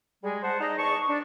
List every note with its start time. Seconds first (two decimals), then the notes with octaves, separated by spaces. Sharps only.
0.24 G3 G#3 G#4
0.43 C5 F#5 A5
0.61 D#4 G#4 D5 D#5
0.77 E2 G#4 A5 C#6
1.09 D4